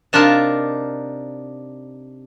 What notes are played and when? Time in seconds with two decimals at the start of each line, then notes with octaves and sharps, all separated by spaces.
0.13 C3 D4 D#4 F4 A#4 A5